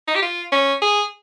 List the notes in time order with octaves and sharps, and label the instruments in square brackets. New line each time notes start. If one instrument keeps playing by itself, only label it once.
[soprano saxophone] D#4
G4
F4
C#4
G#4